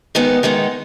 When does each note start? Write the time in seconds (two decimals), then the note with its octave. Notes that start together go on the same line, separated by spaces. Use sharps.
0.15 D#3 G#3 B3 D#4
0.43 D#3 G#3 B3 D#4